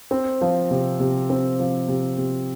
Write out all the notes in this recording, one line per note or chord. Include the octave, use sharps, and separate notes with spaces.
C4
F3
C3
C3
C4
F3
C3
C3